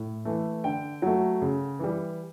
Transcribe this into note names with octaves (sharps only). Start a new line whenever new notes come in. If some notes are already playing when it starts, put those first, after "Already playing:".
Already playing: A2
E3 A3
D3 G5
F#3 A3
C#3
E3 G3